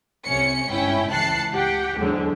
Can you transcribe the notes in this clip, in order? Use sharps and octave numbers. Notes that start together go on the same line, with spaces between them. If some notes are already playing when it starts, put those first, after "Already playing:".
C2 C3 C#4 C#7
G1 G#2 C#4 E4 G5
C#2 E3 A5 F#6 C7 C#7
G4 F#5 G5
E2 G#2 D3 F#3